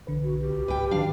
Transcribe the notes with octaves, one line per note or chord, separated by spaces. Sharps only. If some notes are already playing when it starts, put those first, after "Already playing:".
B1 D3 B4
F#4
G4
C#2
G#2 B4 G5
D#3 F#3 D4 F5